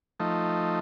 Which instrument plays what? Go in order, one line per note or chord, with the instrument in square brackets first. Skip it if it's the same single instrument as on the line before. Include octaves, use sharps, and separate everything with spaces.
[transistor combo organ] F3 A3 D#4